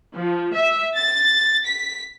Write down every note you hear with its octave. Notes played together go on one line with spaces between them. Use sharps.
F3
E5
A6
B6